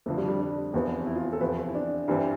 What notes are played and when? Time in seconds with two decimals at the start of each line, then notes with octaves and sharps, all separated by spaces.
0.06 F2 D3 F3 A3
0.17 G3
0.28 G3
0.39 D4
0.73 F1 E2 C3 F3 B3
1.06 E4
1.16 F4
1.33 A4
1.41 E2 C3 F3 C4 B4
1.58 C5
1.67 E4
1.75 D4
2.08 G2 E3 G3 C4